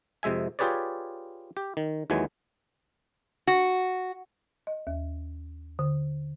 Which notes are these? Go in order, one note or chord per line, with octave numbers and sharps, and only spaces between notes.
F2 C3 G#3 E5 G#5
F4 G4 G#4 B4 C#5 D5
G4
D#3
D#2 E3 F#3 G#3 G#5
F#4
D#5
D#2
D3